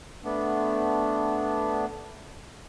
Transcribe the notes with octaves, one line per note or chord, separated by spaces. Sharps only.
A3 B3 D4